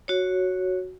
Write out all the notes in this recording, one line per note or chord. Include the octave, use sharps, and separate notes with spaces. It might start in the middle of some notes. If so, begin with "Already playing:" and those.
F#4 C#5